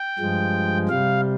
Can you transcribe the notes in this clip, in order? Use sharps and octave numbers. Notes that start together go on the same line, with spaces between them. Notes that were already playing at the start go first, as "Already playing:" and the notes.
Already playing: G5
G2 F3 G#3
C3 G3 F5